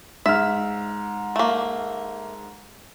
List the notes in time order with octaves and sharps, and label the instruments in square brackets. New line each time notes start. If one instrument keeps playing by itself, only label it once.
[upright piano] G#2 F6 [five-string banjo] E5
[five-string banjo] A3 A#3